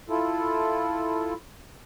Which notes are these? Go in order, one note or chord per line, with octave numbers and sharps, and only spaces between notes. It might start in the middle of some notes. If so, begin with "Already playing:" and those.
E4 F4 A4